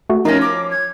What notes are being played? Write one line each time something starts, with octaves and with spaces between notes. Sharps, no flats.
A3 F#4
F3 C#4 D#4 A#4
D6
G#6